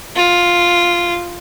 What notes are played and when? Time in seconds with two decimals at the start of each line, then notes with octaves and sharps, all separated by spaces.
0.16 F4